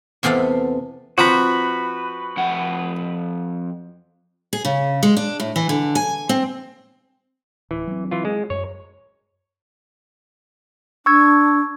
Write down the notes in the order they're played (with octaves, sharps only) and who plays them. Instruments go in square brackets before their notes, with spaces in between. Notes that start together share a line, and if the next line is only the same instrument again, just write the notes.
[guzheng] E2 C3 B3 A4 F5
[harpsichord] F3 C4 A#5 [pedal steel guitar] F#4 B4
[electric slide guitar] F2 F#5
[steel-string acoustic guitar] G#4
C#3
G#3
D4
A2
E3
D3
G#5
C4
[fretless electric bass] D1 [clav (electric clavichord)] E3
[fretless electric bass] F#3 C4
[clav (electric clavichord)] E3 F4
G#3
[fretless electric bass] F#2 [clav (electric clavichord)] C#5
[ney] D4 [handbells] C#6 E6 G#6